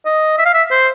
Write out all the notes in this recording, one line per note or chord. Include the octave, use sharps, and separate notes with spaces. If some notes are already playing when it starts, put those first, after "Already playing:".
D#5
E5
F5
E5
C5